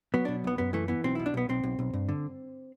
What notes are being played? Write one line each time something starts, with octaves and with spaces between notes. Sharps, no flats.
F#3 B3
B2 D4
B1 B3
F#2 B3
E3 A3
E3 B3
B1 C4
B2 E4
D4
B1 B3
B1 C4
B1
B1
G2
D3